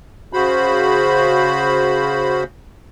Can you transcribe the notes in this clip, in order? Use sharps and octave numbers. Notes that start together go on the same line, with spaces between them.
C#3 F#4 C5 B5